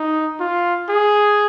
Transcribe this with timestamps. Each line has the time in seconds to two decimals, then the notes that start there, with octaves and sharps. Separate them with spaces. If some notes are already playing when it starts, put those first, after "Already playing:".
Already playing: D#4
0.40 F4
0.89 G#4